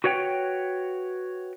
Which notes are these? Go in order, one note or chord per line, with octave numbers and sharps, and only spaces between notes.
F#4 B4 C#5 F#5 G5